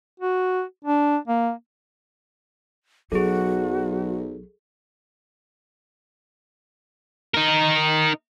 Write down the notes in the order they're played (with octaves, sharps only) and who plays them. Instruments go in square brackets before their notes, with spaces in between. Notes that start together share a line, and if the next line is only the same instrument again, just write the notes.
[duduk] F#4
D4
A#3
[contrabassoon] B1 [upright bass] F#3 [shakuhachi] F#4 [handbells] G#4 A4
[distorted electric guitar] D#4 A#4